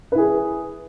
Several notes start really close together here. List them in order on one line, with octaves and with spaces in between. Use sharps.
B4 E4 G#4